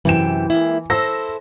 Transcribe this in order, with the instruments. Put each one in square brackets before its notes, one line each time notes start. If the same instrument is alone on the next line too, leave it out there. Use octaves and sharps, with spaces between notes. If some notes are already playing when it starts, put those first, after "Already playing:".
[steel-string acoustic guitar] F#2 C3 G5 [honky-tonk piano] E3 E7
[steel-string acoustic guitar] G#3 A#3 E4
[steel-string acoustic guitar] E4 A4 C5 [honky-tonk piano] E6 A#6